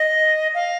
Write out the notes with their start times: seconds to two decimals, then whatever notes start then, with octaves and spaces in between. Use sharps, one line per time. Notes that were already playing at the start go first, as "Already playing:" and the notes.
Already playing: D#5
0.54 F5